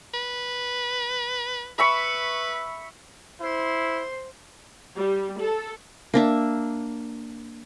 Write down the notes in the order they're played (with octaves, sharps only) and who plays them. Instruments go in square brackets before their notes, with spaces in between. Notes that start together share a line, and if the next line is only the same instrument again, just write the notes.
[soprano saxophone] B4
[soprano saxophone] B4 [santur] E5 B5 C#6
[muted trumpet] E4 [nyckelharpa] C5 C6
[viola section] G3
A4
[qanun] A#3 D4 E5